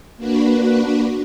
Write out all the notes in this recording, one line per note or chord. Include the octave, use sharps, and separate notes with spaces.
A#3 D4 F#4 B4